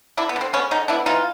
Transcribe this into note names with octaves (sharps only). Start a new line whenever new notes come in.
D3 D4 E4
B3
D3
C4
G#3 B3 C#4
D3 C#4 D#4
B3 D4 E4
E3 D#4 F4